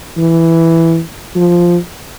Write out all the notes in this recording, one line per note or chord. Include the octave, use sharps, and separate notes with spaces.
E3
F3